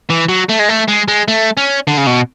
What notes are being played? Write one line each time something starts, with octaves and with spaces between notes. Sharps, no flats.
E3
F#3
A3
G#3
A3
G#3
G#3
A3
C#4
D3
C#3
B2